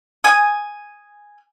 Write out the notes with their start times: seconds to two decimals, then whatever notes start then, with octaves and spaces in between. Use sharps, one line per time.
0.24 G#5 D#6